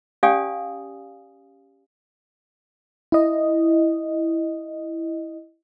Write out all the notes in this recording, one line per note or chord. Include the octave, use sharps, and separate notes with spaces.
C#4 G4 D5 F5 G#5 D#6
E4 D#5